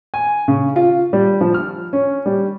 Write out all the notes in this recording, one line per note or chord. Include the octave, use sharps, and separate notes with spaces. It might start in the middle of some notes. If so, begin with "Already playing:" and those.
G#5
C#3
F4
G3
F3
F6
C#4
G3